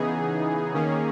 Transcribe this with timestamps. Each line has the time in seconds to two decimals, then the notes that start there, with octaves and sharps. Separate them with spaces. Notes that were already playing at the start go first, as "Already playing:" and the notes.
Already playing: C#3 E3 B3 D#4 G#4
0.74 D#3 A#3 C#4